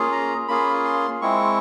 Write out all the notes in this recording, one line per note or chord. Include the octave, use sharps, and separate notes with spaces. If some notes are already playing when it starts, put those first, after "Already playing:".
Already playing: A#3 C#4 F4 G#4
A#5
A#3 C#4 F4 G#4 B5
C6
G#3 C4 E4 C#6